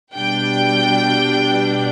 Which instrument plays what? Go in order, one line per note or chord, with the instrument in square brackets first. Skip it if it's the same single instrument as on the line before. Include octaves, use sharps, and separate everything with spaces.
[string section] B2 G3 D4 G5